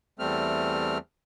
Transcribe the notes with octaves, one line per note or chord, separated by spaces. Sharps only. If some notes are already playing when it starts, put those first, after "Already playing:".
E2 G3 A3 C4 F6